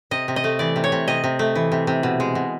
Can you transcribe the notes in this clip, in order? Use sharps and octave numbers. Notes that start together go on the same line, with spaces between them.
C3 D#5
C3
D#5
A3
E3 D5
C3
C#5
C3
C3 D#5
C3
A3
E3
C3
C3
B2
G#3
B2